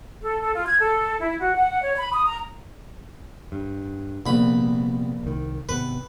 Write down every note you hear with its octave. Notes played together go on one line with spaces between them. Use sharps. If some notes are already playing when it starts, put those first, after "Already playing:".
A4
A4
F4
G#6
A4
E4
F#4
F#5
C#5
B5
D#6
A#5
G2
A#1 C3 G3 B3 B5
C2 D#3
G#1 C3 B3 B4